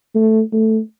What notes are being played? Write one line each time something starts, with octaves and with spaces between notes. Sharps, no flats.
A3
A3